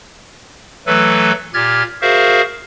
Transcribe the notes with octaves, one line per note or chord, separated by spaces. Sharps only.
E3 F#3 A3 A4 B4
A#2 G4 F6 G#6 A6
F#4 G#4 A#4 C5 E5 F5